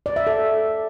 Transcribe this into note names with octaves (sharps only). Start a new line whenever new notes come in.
D5
E5
A4